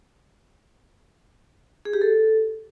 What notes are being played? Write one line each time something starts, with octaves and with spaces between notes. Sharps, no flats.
G#4
G4
A4